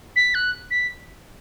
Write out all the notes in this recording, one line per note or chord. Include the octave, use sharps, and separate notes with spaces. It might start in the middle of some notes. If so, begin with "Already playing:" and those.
B6
F#6
B6